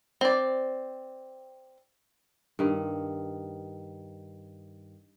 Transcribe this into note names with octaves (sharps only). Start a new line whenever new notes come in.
C4 D5
G2 D#3